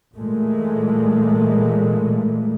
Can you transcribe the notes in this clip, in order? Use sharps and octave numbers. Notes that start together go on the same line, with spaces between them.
A#2 E3 G#3 A3